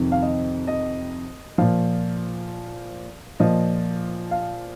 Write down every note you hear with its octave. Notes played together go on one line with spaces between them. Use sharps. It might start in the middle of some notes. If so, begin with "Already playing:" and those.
Already playing: F2 C3 D#3
F5
D#5
D#5
A#2 F3 F5
A#2 F3 D#5
F5